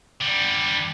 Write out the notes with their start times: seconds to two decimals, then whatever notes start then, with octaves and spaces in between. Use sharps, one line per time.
0.22 D3 G3